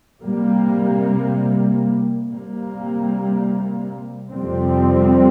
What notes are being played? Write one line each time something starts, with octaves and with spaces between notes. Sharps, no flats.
C3 G3 A#3
C3 G3 A#3
F2 C3 G3 C4